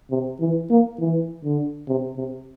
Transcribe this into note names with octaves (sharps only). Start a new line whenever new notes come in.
C3
E3
A#3
E3
D3
C3
C3